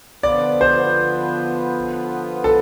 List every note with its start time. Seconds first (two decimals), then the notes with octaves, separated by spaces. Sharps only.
0.23 D3 F3 B3 F4 B4 D5
0.61 C5
2.44 A4